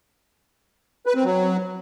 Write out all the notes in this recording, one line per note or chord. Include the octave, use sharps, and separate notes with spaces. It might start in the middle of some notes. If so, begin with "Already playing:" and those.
B4
C4
F#3